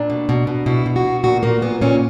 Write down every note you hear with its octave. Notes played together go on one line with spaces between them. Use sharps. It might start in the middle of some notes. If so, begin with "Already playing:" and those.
Already playing: A#2 D4
B2
B2
B2
B2 E4
B2
F#4
B2
A#2 F#4
A#2 A#3
A#2 B3
A#2 C#4